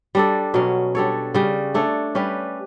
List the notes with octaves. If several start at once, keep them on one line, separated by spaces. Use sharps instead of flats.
G3 D4 A4
B2 F#3 C#4
G3 D4 A4 C#5
C#3 G3 C#4
A3 D4 A4 C#5
G3 C#4 G4 B4